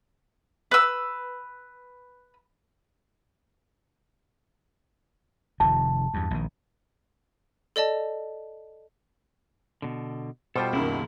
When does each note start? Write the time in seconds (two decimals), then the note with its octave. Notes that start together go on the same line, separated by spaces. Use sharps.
0.71 B4 E6
5.60 F1 C3 D#3 A5
6.14 E2 G2
6.31 A#1 D#3
7.76 A4 D5 D#5 A5
9.82 B2 D3
10.56 B2 G3 F4 A4 C5 G5
10.73 C#2 F#2 D#3 A#3 E4